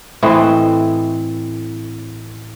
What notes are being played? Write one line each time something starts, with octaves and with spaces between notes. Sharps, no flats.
A2 E3 C4 D#5